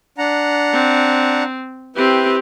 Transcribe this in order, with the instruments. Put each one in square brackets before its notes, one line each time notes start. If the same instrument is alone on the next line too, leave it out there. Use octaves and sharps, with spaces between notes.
[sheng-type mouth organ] D4 F#5 A#5
[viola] C4
[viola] C4 G4 [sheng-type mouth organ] E4 B4